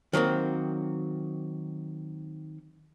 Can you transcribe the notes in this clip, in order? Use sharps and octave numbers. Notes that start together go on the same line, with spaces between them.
D#3 F#3 A#3 C4